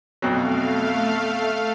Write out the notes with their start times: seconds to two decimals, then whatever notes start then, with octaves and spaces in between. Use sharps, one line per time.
0.22 F2 B2 F#3 A3 F5